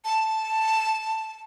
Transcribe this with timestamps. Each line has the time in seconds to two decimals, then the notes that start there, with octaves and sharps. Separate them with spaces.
0.05 A5